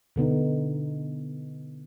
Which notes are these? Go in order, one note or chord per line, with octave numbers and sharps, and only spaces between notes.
B2 D3 B3 D#4